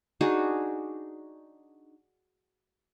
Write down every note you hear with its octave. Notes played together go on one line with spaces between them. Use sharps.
D4 D#4 F#4 G#4